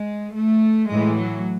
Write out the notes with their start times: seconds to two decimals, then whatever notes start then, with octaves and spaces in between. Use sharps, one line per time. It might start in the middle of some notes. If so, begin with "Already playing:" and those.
Already playing: G#3
0.35 A3
0.91 A2 E3 G#3
1.20 F#3